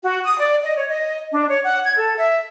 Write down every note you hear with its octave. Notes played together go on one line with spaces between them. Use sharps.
F#4
D#6
D5
D#5
C#5
D#5
D4
C#5
F#5
G#6
A4
E5